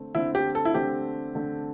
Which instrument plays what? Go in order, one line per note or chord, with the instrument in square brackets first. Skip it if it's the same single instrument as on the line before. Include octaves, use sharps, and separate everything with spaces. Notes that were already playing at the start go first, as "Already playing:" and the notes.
Already playing: [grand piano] D3 A3 C4
[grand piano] D3 A3 C4 [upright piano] E4
[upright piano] G4
A4
E4
[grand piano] D3 A3 C4 [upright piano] G4
[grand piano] D3 A3 C4